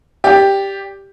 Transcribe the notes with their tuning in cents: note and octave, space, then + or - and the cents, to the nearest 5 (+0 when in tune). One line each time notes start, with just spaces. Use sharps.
G4 +5 D5 -20